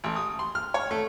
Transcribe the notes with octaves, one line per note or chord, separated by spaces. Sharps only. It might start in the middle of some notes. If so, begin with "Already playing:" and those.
A1
D#6
C6
F6
C#5
A3